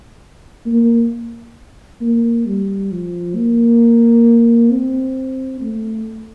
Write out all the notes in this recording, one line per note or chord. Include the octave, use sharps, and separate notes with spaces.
A#3
A#3
G3
F3
A#3
C4
A3